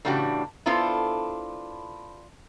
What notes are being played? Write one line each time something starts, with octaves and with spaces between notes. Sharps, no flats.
A2 C#3 E3 D4 F#4 G4
B3 D4 E4 F4 A4 C5